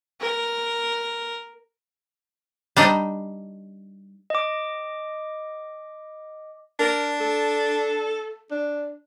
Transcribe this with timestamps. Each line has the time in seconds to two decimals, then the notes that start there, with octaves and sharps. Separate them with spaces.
0.21 A#4
2.76 G3 D4 D#4 D#5
4.30 D#5 D6
6.80 D4 A#4
7.20 A4
8.51 D4